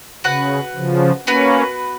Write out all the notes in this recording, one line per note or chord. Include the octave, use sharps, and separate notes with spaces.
C#3 F#4 B4 F#5
C#3 F3
A#3 B3 C#4 F#4 B4